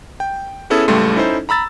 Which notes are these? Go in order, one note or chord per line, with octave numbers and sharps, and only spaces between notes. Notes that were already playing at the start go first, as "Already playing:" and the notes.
G5
B3 C#4 E4 G#4 A4
C#2 A2 G3 A3 C6
C#4 D#4 E4 A4 C5
A#5 B5 E6 A6